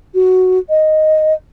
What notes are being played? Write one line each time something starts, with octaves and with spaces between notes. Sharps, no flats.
F#4
D#5